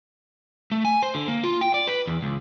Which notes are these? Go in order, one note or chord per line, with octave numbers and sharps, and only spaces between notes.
A3
G#5
C5
D3
A#3
F4
G5
D5
B4
E2
C#2